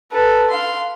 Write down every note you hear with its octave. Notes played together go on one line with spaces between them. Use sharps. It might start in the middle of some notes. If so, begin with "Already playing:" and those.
A4 B4
F5 C6